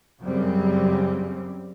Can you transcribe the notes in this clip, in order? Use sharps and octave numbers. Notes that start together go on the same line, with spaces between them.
F#2 C#3 G3 C4